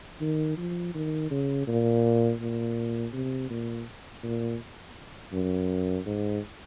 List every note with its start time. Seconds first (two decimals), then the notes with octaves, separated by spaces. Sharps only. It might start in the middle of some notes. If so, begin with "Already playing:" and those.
0.21 D#3
0.58 F3
0.95 D#3
1.31 C#3
1.67 A#2
2.41 A#2
3.13 C3
3.50 A#2
4.23 A#2
5.33 F#2
6.06 G#2